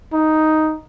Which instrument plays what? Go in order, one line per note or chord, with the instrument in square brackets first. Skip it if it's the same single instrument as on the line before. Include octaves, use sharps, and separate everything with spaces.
[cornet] D#4